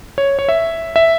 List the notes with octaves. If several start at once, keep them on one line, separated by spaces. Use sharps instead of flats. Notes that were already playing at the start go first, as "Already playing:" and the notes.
C#5
C#5
E5
E5